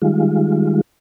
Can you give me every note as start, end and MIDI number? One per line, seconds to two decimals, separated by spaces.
0.02 0.81 51
0.02 0.81 55
0.02 0.81 56
0.02 0.81 65